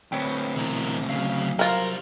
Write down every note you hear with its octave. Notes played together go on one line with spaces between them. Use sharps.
D2 C4 B4 C#5 G5
B2 E3 A#4
C#3 F#3 F5
F3 G3 F4 A#4 C5